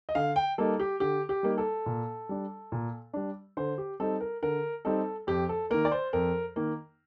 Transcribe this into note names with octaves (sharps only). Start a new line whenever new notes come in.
D#5
D3 F5
G5
G3 A#3 D#4 A4
G4
D3 G4
G4
G3 A#3 D#4
A4
A#2
G3 D4
A#2
G3 D4
D3 C5
G4
G3 C4 D#4 A4
A#4
D3 A#4
G3 C4 D#4 A4
F2 G4
A4
D#3 A#3 A#4
D5
C5
F2 A#4
D#3 A#3